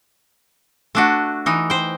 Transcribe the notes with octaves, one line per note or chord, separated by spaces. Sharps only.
A3 D4 F#4
E3 D#4
C5 G5